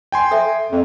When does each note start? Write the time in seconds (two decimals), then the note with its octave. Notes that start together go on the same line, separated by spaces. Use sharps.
0.12 G5 G#5 C6
0.31 A4 E5
0.70 F2